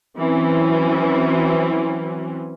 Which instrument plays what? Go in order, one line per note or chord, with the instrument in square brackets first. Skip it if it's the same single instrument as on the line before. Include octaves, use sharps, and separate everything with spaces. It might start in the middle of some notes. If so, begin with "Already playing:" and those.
[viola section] E3 F#3 C4 C#4